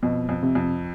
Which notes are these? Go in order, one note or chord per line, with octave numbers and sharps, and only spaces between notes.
F2 B2
F2
C3
F2